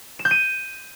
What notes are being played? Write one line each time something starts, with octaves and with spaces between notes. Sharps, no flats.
E7
G6
D#7